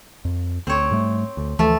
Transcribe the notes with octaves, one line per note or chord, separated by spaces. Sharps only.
F2
D2 C4 C#5
G#2 G3 A3
D2
D2 E3 F3 A3 A4